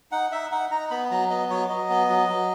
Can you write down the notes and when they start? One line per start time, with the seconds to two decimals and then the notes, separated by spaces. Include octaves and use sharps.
0.12 D#4 F#5
0.32 D#4 E5
0.52 D#4 F#5
0.71 D#4 A#5
0.91 B3 B5
1.11 F#3 A#5
1.30 B3 D#5
1.50 F#3 C#5
1.70 F#3 D#5
1.90 B3
2.09 F#3
2.29 F#3